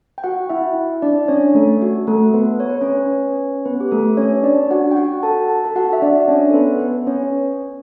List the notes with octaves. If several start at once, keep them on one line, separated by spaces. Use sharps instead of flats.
G5
F#4 F#5
E4 E5
D4 D5
C#4 C#5
A3 A4
F#4
A3 A4
B3 B4
C#5
B4
C#4 C#5
B3 B4
G4
A3 A4
C#4 C#5
D4 D5
F#4 F#5
G5
F#4 F#5
A4 A5
A5
A4 A5
F#4 F#5
E5
D4 D5
D5
C#4 C#5
A4
B3 B4
B3 B4
C#4 C#5